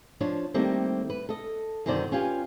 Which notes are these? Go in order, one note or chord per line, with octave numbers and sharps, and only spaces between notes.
F3 D4 C#5
D#3 G3 A3 A#3 C4
B4
A4 D#5
F#2 B2 D3 D#3 C5 D5
C#4 F4 G4 B4 G#5